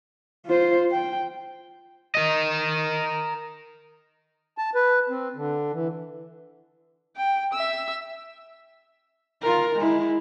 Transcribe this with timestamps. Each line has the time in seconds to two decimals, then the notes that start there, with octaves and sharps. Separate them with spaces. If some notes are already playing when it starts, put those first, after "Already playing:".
0.47 F4 C5
0.91 G5
2.15 A#4 D#5
4.58 A5
4.75 B4
5.09 C4
5.36 D3
5.72 E3
7.17 G5
7.53 E5 E6
9.42 F4 A#4
9.77 G#3 E4